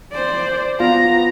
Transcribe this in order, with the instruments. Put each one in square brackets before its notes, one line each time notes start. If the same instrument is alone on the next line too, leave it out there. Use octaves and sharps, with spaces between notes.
[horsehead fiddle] C5 D5
[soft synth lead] B3 [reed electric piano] F4 [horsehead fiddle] A#5